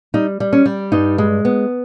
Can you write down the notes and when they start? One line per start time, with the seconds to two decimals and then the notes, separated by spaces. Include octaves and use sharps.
0.14 G3 D#4
0.40 G3
0.53 C#4
0.66 G3
0.92 G2 D#4
1.18 G#3
1.45 B3